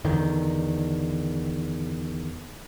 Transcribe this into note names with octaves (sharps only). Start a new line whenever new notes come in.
E2 D3 D#3